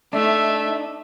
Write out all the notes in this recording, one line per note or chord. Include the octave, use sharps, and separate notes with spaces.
A3 D4 D#4 E5